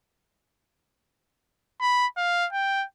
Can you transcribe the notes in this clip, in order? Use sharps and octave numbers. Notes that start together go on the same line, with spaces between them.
B5
F5
G5